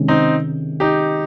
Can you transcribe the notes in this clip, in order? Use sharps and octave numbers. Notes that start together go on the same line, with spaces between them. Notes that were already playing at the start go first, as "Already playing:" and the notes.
Already playing: C3 D#3 G#3 C#4
C4 D#4
D#4 G4